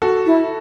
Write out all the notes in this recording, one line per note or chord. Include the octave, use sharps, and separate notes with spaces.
F#4 A4
E4